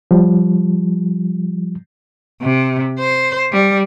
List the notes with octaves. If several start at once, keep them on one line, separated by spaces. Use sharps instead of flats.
F3 G3
C3
C5
G3